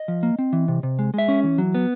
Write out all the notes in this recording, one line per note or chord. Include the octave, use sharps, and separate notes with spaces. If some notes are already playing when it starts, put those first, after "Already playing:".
Already playing: D#5
F3
A#3
C4
E3
C3
C3
G#3
G#3 E5
C#4
E3
F#3
B3